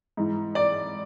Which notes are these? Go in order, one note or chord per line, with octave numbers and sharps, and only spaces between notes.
G#2 E3
D5